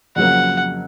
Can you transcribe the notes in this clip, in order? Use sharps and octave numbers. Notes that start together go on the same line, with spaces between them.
F2 C#3 F#3 A#3 F#5